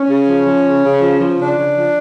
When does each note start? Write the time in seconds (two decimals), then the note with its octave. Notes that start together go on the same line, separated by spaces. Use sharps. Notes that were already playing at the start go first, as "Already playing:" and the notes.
Already playing: C#4
0.09 C#3
0.27 F3
0.47 F3
0.65 C#3
0.83 C#3
1.01 F3
1.20 F3
1.39 C#3 D4
1.57 C#3
1.75 F3